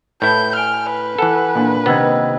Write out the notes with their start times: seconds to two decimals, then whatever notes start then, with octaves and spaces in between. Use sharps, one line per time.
0.22 A2 E4 B4 A5 B5 G6
0.56 G#5 F6 D7 G7
0.90 B4
1.19 E3 A4 F#5 G#5 F#6
1.55 A#2 D4
1.86 C3 D#3 B3 G5 E6 G#6